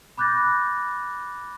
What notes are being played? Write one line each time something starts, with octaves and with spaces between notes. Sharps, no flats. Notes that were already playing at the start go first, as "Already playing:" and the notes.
B5 D6 F#6 G6 A6 A#6